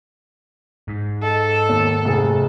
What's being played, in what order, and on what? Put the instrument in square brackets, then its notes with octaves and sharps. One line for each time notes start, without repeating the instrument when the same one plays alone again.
[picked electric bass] G#2
[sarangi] A4 [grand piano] D#5
[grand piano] D#2
F1 G#4